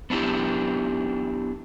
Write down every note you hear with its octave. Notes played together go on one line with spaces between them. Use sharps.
B3 D4 E4 G4